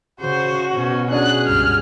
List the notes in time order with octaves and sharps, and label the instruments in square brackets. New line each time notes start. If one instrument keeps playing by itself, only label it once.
[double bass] C#3 [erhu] F#4 [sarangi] C5
[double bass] B2 [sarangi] C#4
[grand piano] C#4 D4 F#4 [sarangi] G#4 [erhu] F#6
[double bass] C#2 G2 [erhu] F6